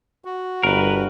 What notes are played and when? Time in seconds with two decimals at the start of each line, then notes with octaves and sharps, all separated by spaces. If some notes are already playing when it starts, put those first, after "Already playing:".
0.25 F#4
0.63 G1 A#4 B4